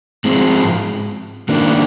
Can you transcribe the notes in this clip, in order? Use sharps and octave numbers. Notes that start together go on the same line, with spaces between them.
G#2 F3 G#3 C4
G#2 D#3 A#3 D4